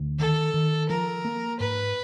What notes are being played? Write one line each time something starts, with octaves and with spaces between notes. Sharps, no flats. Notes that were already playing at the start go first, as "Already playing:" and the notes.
Already playing: D2
D#3 A4
D#3
F3 A#4
A#3
G#2 B4